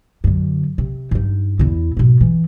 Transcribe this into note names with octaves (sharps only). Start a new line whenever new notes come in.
F#2 D3
C3
G2 D#4
E2 E4
G#2 B2
E3